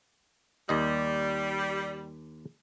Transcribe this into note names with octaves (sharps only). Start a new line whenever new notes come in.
D#2 G3 D#5